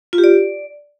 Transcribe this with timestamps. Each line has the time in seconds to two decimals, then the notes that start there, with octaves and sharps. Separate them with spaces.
0.13 F4
0.18 G4
0.24 D5